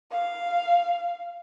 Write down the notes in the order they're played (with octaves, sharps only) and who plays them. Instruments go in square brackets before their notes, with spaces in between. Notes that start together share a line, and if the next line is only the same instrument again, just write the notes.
[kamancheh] F5